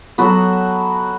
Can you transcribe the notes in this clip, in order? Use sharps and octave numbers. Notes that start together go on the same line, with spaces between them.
F#3 B3 F#4 A4